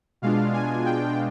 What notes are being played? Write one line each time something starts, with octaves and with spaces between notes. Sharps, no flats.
B2 G#3 D4 F4 F5
G#5
G5